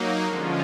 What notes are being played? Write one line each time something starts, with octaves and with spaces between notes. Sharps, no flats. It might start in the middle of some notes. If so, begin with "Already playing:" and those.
Already playing: F#3 A#3 D#4
D3 F3 G#3 C#4 F4